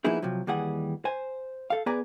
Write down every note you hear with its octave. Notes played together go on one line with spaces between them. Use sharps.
F3 A#3 B3 D#4 E4 G#4
C3 F3 F#3
D#2 E3 G3 G#4 F#5
C5 G#5
A4 F5
B3 G#4 B4 D5 G#5 A#5